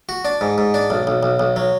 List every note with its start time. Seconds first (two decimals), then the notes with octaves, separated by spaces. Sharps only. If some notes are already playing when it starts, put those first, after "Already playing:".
0.09 F#4
0.25 D4
0.41 G#2
0.58 G#2
0.74 D4
0.90 B1
1.07 B1
1.23 B1
1.39 B1
1.56 F#3